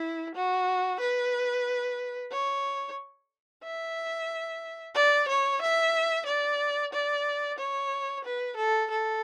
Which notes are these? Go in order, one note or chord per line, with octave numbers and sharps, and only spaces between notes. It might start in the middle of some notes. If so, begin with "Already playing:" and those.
Already playing: E4
F#4
B4
C#5
E5
D5
C#5
E5
D5
D5
C#5
B4
A4
A4